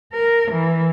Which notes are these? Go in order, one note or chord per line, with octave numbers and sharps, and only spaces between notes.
A#4
E3